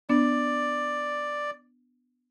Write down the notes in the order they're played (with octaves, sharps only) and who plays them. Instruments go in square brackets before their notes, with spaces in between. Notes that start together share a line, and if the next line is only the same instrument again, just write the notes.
[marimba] B3 D4 [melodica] D5